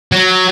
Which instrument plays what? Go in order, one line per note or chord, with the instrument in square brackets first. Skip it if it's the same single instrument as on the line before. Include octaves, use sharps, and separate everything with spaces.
[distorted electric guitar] F#3